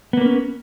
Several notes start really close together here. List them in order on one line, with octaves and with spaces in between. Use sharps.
B3 A#3 B4 C#4